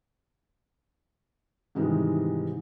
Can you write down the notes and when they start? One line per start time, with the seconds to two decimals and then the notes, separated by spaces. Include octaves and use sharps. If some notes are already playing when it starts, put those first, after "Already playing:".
1.75 G#2 C3 D#3 E3 G3 G#3